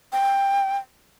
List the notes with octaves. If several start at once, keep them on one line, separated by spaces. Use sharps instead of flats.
G5